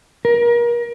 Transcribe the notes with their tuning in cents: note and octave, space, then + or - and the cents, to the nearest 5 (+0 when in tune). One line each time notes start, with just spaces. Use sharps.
A#4 +30